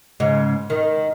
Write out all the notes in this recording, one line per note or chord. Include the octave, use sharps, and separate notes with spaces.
G#2 C#3
D#3